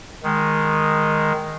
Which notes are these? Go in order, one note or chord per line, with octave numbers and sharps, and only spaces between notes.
D#3 G#3